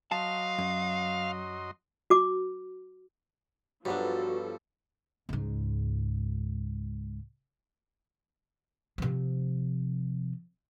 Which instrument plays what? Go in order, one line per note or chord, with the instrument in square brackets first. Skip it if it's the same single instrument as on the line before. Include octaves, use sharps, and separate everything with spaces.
[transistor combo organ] F#3 D#5 C6 [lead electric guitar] F5 [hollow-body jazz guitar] A5
[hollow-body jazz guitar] F#2
[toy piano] F#4 D6
[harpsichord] G2 [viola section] F3 A4 [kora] F#3 B3 D4 [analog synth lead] F#4
[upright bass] C#2 G#2
C3 F3